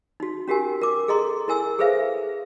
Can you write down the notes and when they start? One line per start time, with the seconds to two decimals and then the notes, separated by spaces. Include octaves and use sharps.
0.20 D#4 F#4
0.48 C#4 F#4 G4 A#4 G#5
0.81 A#4 D6
1.08 G#4 A4 D#5 A#5 C6
1.48 E4 A#4 G#5 E6
1.79 G#4 A4 B4 C5 E5 F5